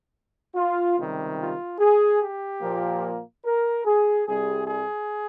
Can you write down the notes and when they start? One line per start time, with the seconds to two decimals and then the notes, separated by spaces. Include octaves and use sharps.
0.55 F4
0.97 C#2 C3 D#3 G3
1.38 F4
1.79 G#4
2.20 G4
2.62 A#2 F3 A#3
3.44 A#4
3.85 G#4
4.26 C2 C3 G3 G#4
4.67 G#4